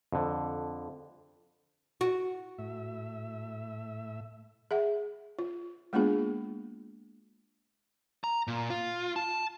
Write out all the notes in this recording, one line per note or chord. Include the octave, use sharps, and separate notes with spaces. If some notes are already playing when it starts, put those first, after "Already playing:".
F2 D3
F#4
A2 E5
G#4 E5 F#5
F4
G#3 A#3 B3 D4 F4 G#4
A#5
A#2
F4
A5